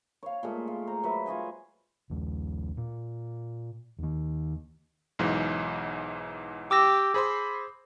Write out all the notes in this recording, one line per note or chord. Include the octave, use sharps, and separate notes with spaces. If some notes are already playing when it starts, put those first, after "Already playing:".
C#5 F5
A#2 G#3 A3
F4
C5 A#5
F#3 B4 E5
F4 C#5 D#5 G#5
A#1 D#2
A#2
D#2 D#3
B1 G#2 E3
G4 D6 E6 A#6
G#4 C5 B5 C6